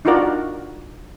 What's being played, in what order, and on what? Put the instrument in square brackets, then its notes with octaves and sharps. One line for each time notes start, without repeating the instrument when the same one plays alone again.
[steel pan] D4 D#4 F4 F#4 A#4 D5